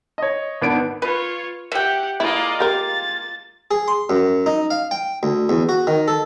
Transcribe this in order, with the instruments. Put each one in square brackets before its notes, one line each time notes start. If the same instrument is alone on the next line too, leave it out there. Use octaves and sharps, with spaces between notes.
[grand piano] C#5 D#5
G#1 B3 D4 D7
[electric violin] F4 C#5 [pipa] B4
[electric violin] G4 F#5 [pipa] E5 G5
[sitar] G#3 A#3 F4 [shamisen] E4 [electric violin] D5 D#5
[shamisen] G4 A#4 [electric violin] A6
[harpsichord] G#4
C6
F#2
D#4
F5
G5
D2
E2
F#4
D#3
A4